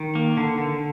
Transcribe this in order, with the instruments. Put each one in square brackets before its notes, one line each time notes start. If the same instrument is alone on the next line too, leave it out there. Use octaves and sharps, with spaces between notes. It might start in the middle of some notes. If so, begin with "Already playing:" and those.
Already playing: [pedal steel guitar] D#3
A#3
D3
D3